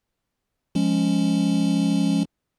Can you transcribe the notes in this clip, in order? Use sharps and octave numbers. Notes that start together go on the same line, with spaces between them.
F3 G#3 C#4